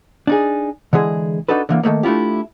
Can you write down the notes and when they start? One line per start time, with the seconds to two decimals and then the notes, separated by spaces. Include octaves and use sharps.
0.27 D4 D#4 G#4
0.93 D3 E3 G#3 G#4
1.48 D4 D#4 F#4 A4 B4
1.69 D3 E3 A#3
1.83 D#3 E3 A3 A#3
2.03 A3 D4 E4 F4 G4